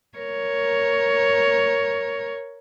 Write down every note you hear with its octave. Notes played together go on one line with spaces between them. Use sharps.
A#4 C#5